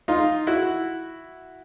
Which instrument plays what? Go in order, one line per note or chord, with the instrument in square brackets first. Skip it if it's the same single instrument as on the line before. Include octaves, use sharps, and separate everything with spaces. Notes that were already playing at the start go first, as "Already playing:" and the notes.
[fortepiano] D#4 F4
E4 F#4